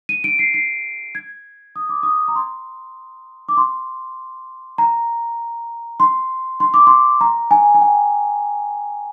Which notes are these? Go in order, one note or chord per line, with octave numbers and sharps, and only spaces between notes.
D#7
D7
C7
C7
G#6
D#6
D6
D#6
A#5
C6
D6
C6
A#5
C6
C6
D6
C6
A#5
G#5
G#5
G5